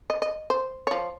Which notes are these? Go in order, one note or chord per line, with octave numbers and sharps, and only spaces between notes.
D#5
D#5
C5
F3 C#5